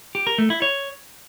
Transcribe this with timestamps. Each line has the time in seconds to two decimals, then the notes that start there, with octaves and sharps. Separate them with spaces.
0.15 G4
0.27 A#4
0.38 A3
0.50 E4
0.62 C#5